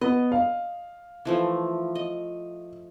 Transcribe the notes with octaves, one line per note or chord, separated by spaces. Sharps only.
B3 D#5
F5
E3 F3 A3
D#5